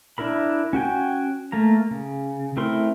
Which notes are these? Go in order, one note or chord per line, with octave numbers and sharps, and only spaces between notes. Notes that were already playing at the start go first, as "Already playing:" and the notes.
D4 E4 A#4 B5
C#4 F#4 G5 G#5
A3 A#3 A#5
C#3
A3 C4 E4 A#4 C6